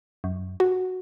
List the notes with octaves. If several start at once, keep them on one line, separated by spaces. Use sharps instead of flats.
F#2
F#4